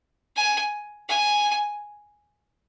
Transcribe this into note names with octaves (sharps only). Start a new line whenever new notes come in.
G#5
G#5